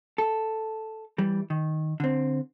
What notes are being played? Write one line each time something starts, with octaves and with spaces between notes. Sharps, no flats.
A4
E3 G3
D#3
D3 C4